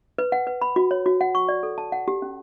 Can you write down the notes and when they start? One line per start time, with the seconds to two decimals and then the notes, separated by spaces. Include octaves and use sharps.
0.18 B4
0.32 F#5
0.47 B4
0.62 B5
0.76 F#4
0.91 C#5
1.06 F#4
1.21 F#5
1.35 C#6
1.49 D5
1.63 A4
1.78 A5
1.92 F#5
2.08 G4
2.22 C#4